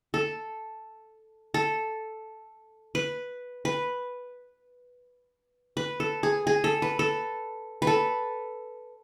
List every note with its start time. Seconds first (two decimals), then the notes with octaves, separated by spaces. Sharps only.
0.14 A4
1.54 A4
2.95 B4
3.65 B4
5.77 B4
6.00 A4
6.23 G#4
6.47 G#4
6.64 A4
6.82 B4
6.99 A4
7.82 B4
7.87 A4